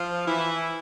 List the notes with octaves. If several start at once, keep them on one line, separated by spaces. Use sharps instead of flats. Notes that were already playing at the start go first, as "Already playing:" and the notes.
Already playing: F3 F4
E3 E4